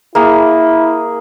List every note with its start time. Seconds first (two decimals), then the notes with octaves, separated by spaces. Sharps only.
0.15 A#3 E4 G#4